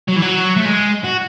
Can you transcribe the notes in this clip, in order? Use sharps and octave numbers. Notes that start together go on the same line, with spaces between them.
F#3
E3
F#3
A3
G#3
F#4